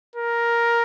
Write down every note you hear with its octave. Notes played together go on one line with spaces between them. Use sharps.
A#4